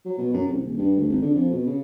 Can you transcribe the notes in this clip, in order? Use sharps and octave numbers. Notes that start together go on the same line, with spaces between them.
F#3
B2
F#2
C2
D#1
G2
D2
G#1
D3
F2
B2
C#3